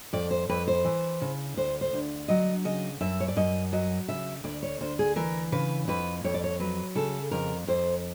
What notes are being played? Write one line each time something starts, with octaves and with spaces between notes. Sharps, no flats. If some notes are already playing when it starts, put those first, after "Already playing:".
F2 D5
C5
F2 B4
C5
E3
C#3
D2 C5
C5
D2
F#3 D#5
C#3 D#5
F#2 E5
C#5
D5
F#2 D#5
F#3 D#5
C#3 E5
D2 D5
C#5
D2 C5
G#4
E3 A#4
C#3 B4
F2 B4
F2 C#5
D5
C#5
F#3 B4
C#3 A4
F2 A#4
F2 C5